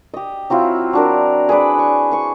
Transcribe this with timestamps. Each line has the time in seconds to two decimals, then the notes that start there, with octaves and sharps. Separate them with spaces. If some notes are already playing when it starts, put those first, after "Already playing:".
0.14 G4 D#5
0.50 F#3 C4 E4 F4
0.93 F#3 D4 A#4
1.49 G#4 B4 D5 B5
1.79 C#6
2.11 G#5 C#6